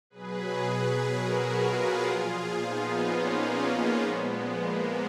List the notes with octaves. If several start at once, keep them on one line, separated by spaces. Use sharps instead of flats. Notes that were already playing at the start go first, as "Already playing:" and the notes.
B2 F#3 G#4 B4
F#4 A#4
F4 G#4
A#2 F3
B3 D#4
A#3 C#4
A#2 F3 G#3 B3
A#3